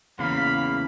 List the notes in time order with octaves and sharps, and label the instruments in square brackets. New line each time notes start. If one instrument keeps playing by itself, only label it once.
[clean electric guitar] E2 C#3 A#3 [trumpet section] F5 B5